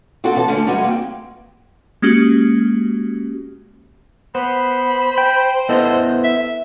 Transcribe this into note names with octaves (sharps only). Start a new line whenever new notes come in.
C4 D4 F4 F#4 A4
C#3 E3 A4 F5 A5
D3 A3 C#4
E2 G3 G#3 D#4 F#4 G#5
A#3 C4 G5
G#3 A#3 C#4 F#4 G4
B3 C5 B5
G5
B3 E4 A4 D#5
E5